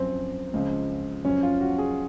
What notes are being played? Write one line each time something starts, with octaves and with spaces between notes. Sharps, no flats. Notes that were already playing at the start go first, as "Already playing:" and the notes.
Already playing: F#2 F3 C4
C#2 C#3 F3
F#2 F3 C#4
F4
F#4
G#4